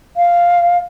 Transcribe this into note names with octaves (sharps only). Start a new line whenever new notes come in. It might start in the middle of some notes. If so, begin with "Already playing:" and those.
F5